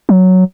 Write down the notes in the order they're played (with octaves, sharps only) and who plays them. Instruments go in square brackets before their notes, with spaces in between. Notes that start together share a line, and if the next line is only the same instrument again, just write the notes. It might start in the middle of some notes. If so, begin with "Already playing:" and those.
[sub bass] F#3